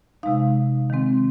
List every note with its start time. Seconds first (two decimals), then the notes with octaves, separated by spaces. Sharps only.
0.23 C3 G#3 D#4 F5
0.90 D#3 G#3 C4